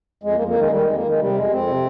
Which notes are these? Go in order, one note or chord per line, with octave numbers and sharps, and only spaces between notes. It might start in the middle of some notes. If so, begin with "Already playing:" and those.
F2 G#3
A#3
F2
A#3
D#3 G#3
D#3 G3
F2 G#3
A#3
D#3 G#3
C3 G3
F2 G#3
F2 C4
C3